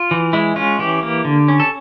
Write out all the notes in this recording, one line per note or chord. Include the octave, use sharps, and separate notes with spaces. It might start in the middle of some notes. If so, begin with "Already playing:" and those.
Already playing: F4
E3
G#3 E4
C#4 F4
E3 G4
A#3
D3
C#4
A4